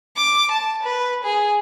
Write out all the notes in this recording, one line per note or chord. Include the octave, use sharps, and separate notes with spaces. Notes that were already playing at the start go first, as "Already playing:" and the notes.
D6
A5
B4
G#4